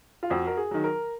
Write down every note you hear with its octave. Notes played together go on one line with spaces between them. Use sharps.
F4
F2 F#4
A#4
G#4
D#3 F#3
A#4